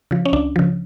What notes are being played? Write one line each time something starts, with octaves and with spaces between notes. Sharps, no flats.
C#3 F3
C#4
C#2 D4
C#3 F3